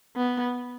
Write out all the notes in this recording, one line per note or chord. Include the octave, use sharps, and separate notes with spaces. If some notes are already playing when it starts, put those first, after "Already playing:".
B3